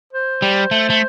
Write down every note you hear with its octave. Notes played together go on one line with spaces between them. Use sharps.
C5
G3
A3
A3